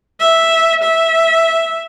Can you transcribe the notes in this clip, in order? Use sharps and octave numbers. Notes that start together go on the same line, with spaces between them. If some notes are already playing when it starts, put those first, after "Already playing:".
E5
E5